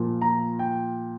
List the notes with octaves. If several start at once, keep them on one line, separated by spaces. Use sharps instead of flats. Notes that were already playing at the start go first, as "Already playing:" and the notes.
Already playing: A#2 F3 A#3
A#5
G5